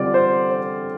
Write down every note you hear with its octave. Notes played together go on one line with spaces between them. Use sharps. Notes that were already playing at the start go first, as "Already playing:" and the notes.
Already playing: D3 G3 C4 F4 D5
C5
C5